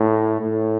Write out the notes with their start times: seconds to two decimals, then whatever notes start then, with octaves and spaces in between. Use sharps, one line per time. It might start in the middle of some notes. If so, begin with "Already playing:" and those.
Already playing: A2
0.41 A2